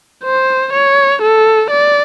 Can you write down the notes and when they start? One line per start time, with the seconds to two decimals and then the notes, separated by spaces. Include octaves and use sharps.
0.24 C5
0.73 C#5
1.22 A4
1.70 D5